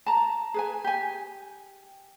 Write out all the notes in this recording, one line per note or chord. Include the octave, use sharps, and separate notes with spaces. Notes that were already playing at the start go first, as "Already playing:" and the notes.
A5 A#5
G#4 B4 G#5
G4 G#5